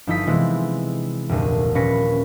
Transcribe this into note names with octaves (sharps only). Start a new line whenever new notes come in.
G1 F3 D#4 E4 D#6 B6
C3 E3 G#3 B3 C4 E4
F1 D2 A#2 D#7
D#1 A#2 C#4 B4 A#6 C#7